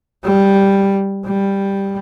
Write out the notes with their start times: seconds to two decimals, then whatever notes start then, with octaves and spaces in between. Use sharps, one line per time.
0.24 G3
1.25 G3